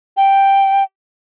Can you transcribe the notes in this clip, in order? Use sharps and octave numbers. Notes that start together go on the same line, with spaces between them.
G5